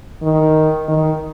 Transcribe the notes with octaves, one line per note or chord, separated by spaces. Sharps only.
D#3
D#3